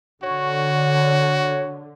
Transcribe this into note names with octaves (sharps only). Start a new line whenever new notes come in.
D3 F#4 C#5